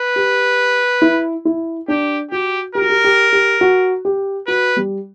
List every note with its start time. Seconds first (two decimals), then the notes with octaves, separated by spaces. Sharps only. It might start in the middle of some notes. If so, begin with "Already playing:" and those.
Already playing: B4
0.16 G4
1.02 E4
1.45 E4
1.88 D4 G4
2.31 F#4 G4
2.75 G4 A#4
2.82 F#4
2.89 G4
3.04 G4
3.32 G4
3.61 F#4
4.05 G4
4.47 F#4 B4
4.76 G3